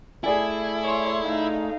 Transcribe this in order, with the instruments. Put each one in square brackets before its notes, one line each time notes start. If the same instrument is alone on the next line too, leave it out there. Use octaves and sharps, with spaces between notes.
[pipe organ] A3 [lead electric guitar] E4 [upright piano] G#4 D5 G#5
[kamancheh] C#5 C6
[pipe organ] A3 [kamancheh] D#4 F5